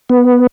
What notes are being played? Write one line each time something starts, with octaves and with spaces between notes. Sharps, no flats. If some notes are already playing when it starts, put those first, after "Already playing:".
B3